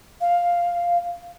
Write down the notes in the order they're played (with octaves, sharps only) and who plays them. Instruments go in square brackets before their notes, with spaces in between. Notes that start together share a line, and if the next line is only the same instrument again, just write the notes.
[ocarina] F5